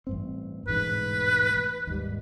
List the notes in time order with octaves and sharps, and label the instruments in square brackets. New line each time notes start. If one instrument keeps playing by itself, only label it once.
[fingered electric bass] A1 G2 C4
[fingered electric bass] E1 A1 G#2 [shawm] B4
[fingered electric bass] D#2 G#2 G3